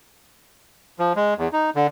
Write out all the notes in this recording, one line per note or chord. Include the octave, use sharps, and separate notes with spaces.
F3
G#3
E2
D#4
D3